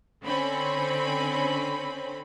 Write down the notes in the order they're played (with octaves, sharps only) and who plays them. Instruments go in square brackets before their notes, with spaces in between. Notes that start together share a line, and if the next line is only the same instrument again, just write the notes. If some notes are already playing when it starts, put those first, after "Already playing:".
[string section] D3 C4 C#4 B5